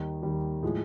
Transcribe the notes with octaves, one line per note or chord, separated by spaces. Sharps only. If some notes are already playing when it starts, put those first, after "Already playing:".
Already playing: D#2 D#3 G3
D#2 D#3 G3
A2 F3 G#3